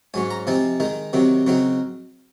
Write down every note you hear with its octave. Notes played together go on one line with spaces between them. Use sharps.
G#2 F#3 C#4 G#5
A#5
C3 F3 C4 D#4 G#5
D#3 G#3 D#4
C3 D#3 F#3 C4
C#3 F#3 C4 D#4